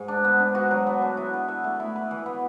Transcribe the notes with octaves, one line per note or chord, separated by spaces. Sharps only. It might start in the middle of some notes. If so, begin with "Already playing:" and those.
Already playing: G#2 G#4
D4
B3
D4
F#4
F#3
B3
D4
E4
B4
E5
A3
E4
B4
E3
B3